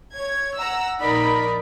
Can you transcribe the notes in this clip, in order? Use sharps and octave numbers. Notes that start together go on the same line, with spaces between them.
C#5 G#6
F#5 A#5 E6
A#1 D#4 A#4 D5 B5